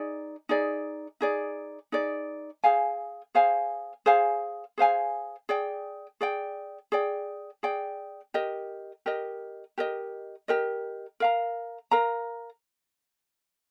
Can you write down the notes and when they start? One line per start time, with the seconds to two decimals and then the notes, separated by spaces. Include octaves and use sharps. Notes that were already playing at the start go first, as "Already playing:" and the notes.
Already playing: D#4 G#4 D5
0.49 D#4 G#4 D5
1.21 D#4 G#4 D5
1.92 D#4 G#4 D5
2.64 G#4 C5 F5 G#5
3.35 G#4 C5 F5 G#5
4.06 G#4 C5 F5 G#5
4.78 G#4 C5 F5 G#5
5.49 G#4 D5 G5
6.21 G#4 D5 G5
6.92 G#4 D5 G5
7.63 G#4 D5 G5
8.34 G4 A#4 D#5
9.06 G4 A#4 D#5
9.78 G4 A#4 D#5
10.48 G4 A#4 D#5
11.20 A#4 F5 A#5
11.91 A#4 F5 A#5